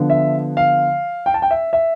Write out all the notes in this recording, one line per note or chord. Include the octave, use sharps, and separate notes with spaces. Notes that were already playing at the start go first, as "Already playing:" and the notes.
Already playing: D3 F3 B3
E5
F5
G5
A5
G5
E5
E5